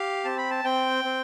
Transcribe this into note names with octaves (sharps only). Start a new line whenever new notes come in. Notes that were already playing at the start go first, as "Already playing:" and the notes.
Already playing: G4 F5
C4 A5
B5
A5
C4 G5
C4